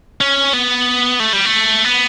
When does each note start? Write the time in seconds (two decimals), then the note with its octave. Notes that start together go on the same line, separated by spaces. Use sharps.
0.21 C#4
0.53 B3
1.20 A3
1.33 G3
1.45 A3
1.85 B3